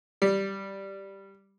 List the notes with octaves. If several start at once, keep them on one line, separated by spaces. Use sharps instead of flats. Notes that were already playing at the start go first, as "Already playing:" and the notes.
G3